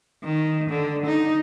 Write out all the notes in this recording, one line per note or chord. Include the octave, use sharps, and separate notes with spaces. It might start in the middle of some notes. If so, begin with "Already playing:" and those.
D#3
D3
D#4